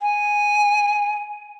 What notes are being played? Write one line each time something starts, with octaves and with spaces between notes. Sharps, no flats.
G#5